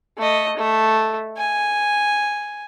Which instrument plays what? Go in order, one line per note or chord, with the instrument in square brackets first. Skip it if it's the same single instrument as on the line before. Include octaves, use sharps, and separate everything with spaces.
[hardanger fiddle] A3 D#5
A3
G#5